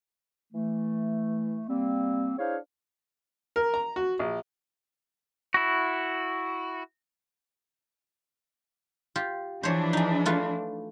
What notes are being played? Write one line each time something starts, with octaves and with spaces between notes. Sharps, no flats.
E3 A3
G3 A#3 C4
D4 E4 G#4 C5 C#5 F5
A#4
A#5
F#4
A#1
E4 F#4
F4 G4
E3 F3 D4 C5 C#5
D#4 G#4
A3 F4 B4